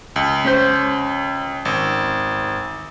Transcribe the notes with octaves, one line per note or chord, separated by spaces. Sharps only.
C#2
C#4 C5
G#1